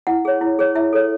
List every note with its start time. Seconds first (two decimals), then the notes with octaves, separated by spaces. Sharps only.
0.07 E4 F#5
0.25 G#4 C#5
0.41 E4
0.59 G#4 C#5
0.75 E4 E5
0.93 A4 C#5